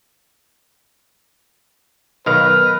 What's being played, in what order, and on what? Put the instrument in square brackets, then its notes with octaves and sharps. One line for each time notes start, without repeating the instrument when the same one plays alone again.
[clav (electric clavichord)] B1 D#3 F5 [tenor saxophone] A#4 [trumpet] B4